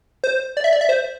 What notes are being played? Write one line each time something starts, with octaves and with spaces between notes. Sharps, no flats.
C5
D5
E5
D5
E5
C5